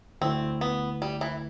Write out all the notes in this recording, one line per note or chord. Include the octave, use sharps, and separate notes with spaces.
D2 D3 A3 C4 E4
B3
G3
E3